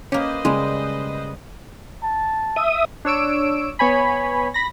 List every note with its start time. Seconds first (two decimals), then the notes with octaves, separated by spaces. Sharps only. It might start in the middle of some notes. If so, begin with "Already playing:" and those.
0.12 A#3 C#4 G4 B4 C5 D#5
0.45 C#3 G3 G#3
2.03 A5
2.56 E5 D#6
3.05 D4 C#5 E6 D7
3.79 B3 C#5 G#5 B5
4.54 B5 A#6